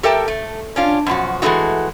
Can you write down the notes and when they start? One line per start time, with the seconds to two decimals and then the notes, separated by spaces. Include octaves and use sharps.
0.03 G4 A4 A#4 E5 G5 A5
0.28 A3
0.76 C#4 D4 F4
1.07 F#2 B2 F3 F#4
1.42 E3 G#3 A3 B3 D#4 F#4